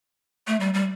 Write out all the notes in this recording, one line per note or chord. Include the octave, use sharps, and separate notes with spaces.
A3
G3
G3